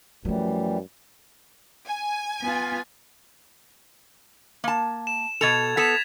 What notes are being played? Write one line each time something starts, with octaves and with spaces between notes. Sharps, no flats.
F#2 E3 F3 G3 A3
G#5
B3 F4
A#3 A5
E7
B2 A4 G#6 A6 F7
B3 A4 B6 E7